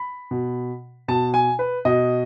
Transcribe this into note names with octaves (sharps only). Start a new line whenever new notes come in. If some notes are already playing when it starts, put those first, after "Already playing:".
Already playing: B5
B2
B2 A5
G#5
B4
B2 D#5